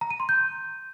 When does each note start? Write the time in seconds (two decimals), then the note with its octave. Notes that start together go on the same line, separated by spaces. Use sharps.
0.01 A#5
0.10 D#7
0.20 C6
0.29 G6